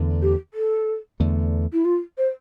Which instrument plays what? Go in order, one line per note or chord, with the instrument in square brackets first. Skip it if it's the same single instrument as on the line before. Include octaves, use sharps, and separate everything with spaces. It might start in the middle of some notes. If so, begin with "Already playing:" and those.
Already playing: [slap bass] E2 D3 A3
[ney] G4
A4
[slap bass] E2 D3 A3
[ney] E4
F4
C5